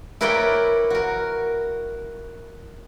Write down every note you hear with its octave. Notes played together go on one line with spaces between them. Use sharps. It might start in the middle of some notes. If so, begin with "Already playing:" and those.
E4 A#4 B4 C#5 D5 G5
F#4 A#4